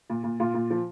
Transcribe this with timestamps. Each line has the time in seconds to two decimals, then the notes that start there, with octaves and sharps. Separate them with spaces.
0.10 A#2
0.24 A#2
0.40 A#2 F4
0.54 A#2
0.70 F3